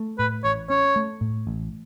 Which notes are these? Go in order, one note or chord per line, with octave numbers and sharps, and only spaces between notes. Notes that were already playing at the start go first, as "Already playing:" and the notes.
Already playing: A3
A2 B4
A1 C#5
C#4 C#5
A3
A2
A1